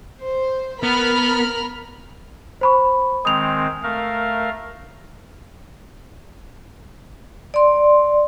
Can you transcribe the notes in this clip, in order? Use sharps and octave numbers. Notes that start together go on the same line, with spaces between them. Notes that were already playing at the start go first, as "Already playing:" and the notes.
C5
B3 A#4 B5 F6
C5 B5 C#6
D#3 G#3 C4 D#6 F7
A3 A#4 F5
D5 C6